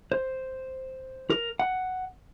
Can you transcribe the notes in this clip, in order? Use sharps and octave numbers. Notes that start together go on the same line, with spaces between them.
C5
A#4
F#5